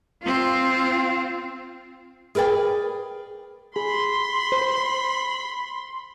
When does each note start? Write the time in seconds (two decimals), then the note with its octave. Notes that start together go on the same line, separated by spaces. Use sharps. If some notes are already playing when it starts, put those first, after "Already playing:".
0.23 C4 F4
2.35 G#4 A#4 B4 D5 G5
3.76 G#4 B5 C6
4.52 C5